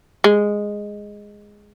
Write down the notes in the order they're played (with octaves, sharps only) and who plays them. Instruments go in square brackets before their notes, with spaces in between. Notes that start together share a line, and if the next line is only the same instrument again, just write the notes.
[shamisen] G#3